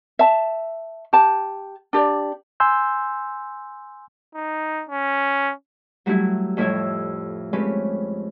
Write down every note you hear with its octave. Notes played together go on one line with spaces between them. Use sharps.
E5 A5
G4 A5
D4 G4 D5
G#5 C6 E6 G6
D#4
C#4
F#3 G3 A3 E4
F2 A2 G3 A3 E4 E5
G#3 A3 C4 C#4 G4 B4